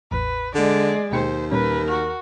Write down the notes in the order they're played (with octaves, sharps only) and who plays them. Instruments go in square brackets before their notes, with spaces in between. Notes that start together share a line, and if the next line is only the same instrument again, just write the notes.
[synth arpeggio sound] A1 E2 A2 [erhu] B4
[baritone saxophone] D3 [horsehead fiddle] G#3 [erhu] D5
[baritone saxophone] D#2 [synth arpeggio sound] B2 G5 C#7 [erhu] C5
[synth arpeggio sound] A#2 G3 C#4 [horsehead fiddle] A#4 [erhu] B4
[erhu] F#4 [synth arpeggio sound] F6